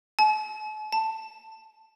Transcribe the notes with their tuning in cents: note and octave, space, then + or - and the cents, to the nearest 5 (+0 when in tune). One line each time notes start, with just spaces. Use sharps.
A5 -45
A5 +10